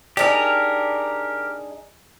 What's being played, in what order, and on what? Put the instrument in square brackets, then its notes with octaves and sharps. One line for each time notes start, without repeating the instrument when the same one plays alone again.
[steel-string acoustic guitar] D4 D#4 G#4 [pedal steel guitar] G4 A#4